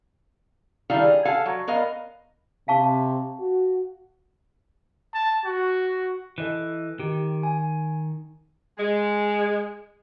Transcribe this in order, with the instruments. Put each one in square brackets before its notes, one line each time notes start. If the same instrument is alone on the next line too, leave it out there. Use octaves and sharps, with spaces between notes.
[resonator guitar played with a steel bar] D#3 G3 E4 A4 F5
G#4
A4 F5 F#5 G#5
F#3
B3 A#4 D#5 F5
[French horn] C3 [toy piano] F5 A5 C#6
[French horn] F#4
[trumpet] A5
F#4
[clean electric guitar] E3 [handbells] A4 D#5 F#6
[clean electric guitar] D#3 [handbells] G4
[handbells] G#5
[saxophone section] G#3